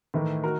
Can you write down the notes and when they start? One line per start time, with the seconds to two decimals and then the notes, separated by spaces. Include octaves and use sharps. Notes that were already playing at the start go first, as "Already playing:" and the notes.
0.14 A2 D#3 E3 A3
0.44 F#4 A#4